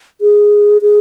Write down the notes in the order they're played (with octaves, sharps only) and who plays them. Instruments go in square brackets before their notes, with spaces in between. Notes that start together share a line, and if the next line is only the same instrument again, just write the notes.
[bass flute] G#4
G#4